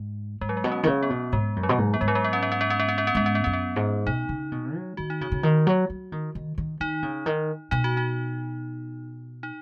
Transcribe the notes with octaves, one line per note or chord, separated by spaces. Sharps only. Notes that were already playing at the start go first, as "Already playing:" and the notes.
Already playing: G#2
G#2 G#3
F#3
G#3
B2
C#4
D#3
C#3
B3
B2
G#2 G#3
F#2
F#3
B2
G#2
B3
G#2 G#3
F#3
G#3
B3
C#4
B3
C#4
B3
C#4
B3
C#4
B3
C#4
G#2 B3
C#4
B3
F#2 C#4
B3
G#2
B2 D#4
C#3
B2
F#3
D#3 F#4
D#4
C#3 F#4
C#3
D#3
F#3
F#3
D#3
D#3
D#3
D#3 D#4
C#3
D#3
B2 D#4
F#4
D#4
D#4